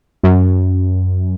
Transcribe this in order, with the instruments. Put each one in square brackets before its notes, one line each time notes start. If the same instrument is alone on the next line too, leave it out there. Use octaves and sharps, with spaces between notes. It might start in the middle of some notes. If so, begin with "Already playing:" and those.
[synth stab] F#2